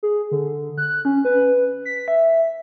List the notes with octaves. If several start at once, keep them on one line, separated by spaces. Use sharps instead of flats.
G#4
D3
F#6
C#4
B4
B6
E5